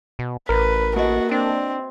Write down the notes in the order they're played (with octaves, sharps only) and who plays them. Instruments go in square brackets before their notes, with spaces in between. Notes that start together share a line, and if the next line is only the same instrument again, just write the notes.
[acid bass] B2
[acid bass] A1 [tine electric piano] A#4 [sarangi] B4
[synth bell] A#3 D#5 [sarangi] F#4
[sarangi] C4 [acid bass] D4